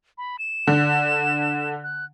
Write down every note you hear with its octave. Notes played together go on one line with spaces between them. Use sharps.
B5
E7
D3
F#6